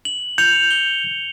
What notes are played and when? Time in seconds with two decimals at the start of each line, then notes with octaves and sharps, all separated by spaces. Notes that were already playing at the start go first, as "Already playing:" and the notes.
0.05 F#7
0.38 G6 C#7 F7
0.71 G7